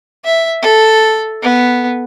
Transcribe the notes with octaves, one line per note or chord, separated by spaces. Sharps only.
E5
A4
B3